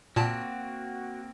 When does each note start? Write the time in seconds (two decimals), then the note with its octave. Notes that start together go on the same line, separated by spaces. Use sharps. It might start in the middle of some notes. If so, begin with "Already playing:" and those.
0.16 A#2 A#3 C4 F#4 A5